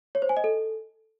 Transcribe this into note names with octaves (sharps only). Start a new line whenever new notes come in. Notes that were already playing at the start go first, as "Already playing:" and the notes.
C#5
C5
G#5
D#5
A4